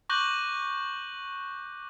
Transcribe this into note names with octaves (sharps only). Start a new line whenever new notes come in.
C#6 D6 F#6 G6 A#6 F#7